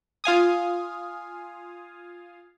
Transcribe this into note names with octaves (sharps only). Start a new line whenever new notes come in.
F4 F5 G#5 D#6